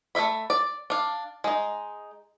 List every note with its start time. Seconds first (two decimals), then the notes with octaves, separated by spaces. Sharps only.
0.15 A3 E4 E5 B5
0.50 D5
0.90 D4 F5
1.44 G#3 D#4